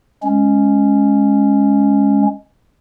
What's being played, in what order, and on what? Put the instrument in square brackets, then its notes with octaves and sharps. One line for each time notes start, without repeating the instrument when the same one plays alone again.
[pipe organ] G#3 C#4